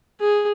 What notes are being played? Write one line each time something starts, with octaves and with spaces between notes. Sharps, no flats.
G#4